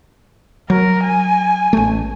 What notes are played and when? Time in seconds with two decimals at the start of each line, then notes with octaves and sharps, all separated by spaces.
0.70 F#3 A#4
1.03 G#5
1.73 A1 A3